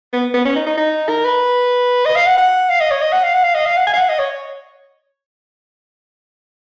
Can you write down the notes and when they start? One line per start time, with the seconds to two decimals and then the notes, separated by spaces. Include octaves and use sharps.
0.13 B3
0.34 B3
0.45 C#4
0.56 D#4
0.66 D#4
0.77 D#4
1.09 A#4
1.25 B4
2.05 D#5
2.16 F5
2.26 F#5
2.37 F#5
2.69 F5
2.80 D#5
2.90 C#5
3.01 D#5
3.12 F#5
3.23 F5
3.34 F#5
3.43 F5
3.54 D#5
3.65 F5
3.77 F#5
3.86 G#5
3.93 F5
3.97 F#5
4.09 D#5
4.19 C#5